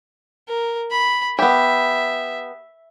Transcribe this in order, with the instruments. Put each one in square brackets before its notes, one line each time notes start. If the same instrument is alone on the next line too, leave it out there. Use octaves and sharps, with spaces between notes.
[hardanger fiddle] A#4
B5
[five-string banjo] B3 G4 [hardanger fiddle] E5